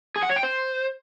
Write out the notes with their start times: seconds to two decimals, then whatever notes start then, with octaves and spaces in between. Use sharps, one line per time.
0.16 G#4
0.23 F#5
0.29 C#5
0.36 G5
0.43 C5